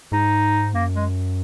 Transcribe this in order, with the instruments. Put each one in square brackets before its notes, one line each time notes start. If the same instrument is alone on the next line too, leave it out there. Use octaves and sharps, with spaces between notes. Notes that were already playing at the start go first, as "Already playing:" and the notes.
[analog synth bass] G#2 [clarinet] D#4
[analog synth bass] F#2 [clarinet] A#3
[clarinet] G#3